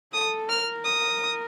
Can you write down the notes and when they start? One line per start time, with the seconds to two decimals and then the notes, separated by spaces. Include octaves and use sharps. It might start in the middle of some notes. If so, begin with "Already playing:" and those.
0.13 A4 D#6
0.48 A#4 F6
0.84 D#6